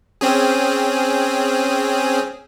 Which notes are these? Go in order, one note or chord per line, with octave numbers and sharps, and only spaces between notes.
C4 C#4 G#4